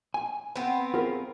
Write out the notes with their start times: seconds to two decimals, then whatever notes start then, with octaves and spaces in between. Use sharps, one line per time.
0.14 G#5
0.56 B3 C4
0.94 F4 G#4 A#4